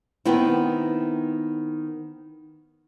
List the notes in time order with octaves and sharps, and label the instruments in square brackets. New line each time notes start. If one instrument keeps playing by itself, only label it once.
[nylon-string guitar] D#3 B3 C4 E4